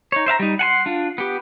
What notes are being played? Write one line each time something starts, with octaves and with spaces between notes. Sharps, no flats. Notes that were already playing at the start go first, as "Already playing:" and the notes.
D#4 C#5
C5 E5 F5 A#5
G3 D#4
F#5 G#5 C6
D4 F4
B3 G4